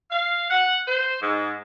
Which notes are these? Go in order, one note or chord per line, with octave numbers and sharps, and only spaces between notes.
F5
F#5
C5
G#2